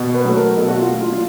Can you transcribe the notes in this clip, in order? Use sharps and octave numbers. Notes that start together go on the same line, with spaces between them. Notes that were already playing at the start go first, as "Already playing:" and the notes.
Already playing: B2
B4
F#3 A3
A#4
B2 A4
F#4
F4
F#3 A3
F4
F4